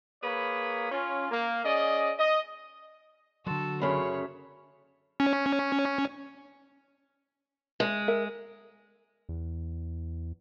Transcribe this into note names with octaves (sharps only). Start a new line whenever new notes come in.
A#3 G#4 B4 C#5 B5
C#4 F4
A#3
C#4 G#4 D5 D#5
D#5
D3 F#3 F#4 A4 C6
F#2 C#3 A3 C#4 C#5 B5
C#4
G#3
A#4 E5
E2